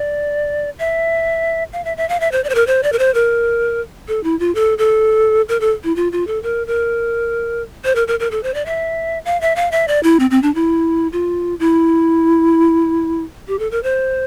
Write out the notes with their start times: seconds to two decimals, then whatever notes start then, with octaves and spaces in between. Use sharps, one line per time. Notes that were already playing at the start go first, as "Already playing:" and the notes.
Already playing: D5
0.79 E5
1.73 F5
1.85 E5
1.97 E5
2.09 F5
2.20 E5
2.32 C5
2.44 D5
2.49 C5
2.55 A#4
2.67 C5
2.83 D5
2.93 A#4
2.99 C5
3.14 A#4
4.08 A4
4.24 E4
4.39 F4
4.55 A4
4.78 A4
5.49 A#4
5.61 A4
5.84 E4
5.96 F4
6.12 F4
6.27 A4
6.43 A#4
6.67 A#4
7.85 C5
7.95 A#4
8.08 A#4
8.20 A#4
8.31 A4
8.43 C5
8.54 D5
8.66 E5
9.25 F5
9.41 E5
9.56 F5
9.72 E5
9.88 D5
10.03 E4
10.20 C4
10.31 C4
10.43 D4
10.55 E4
11.13 F4
11.60 E4
13.48 G4
13.59 A4
13.71 A#4
13.83 C5